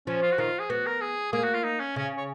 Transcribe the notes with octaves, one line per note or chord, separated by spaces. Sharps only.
F3 C#4
F4
F#4
D#3 F4
G#4
B3 F#4
A#4
G#4
A#3 G#4
F#4
F4
D#4
C#4
C#3 C#4
C#5